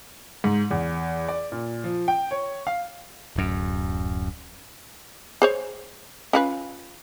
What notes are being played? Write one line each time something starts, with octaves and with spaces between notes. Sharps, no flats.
G#2
E2
D5
A#2
F3
G5
C#5
F5
D1 F#2
G#4 C5 C#5
C#4 F4 B4